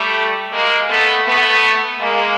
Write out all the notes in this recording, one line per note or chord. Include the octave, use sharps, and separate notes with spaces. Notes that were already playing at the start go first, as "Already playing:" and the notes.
Already playing: G3 A3
G#3 A#3
A3 B3
A3 B3
G#3 A#3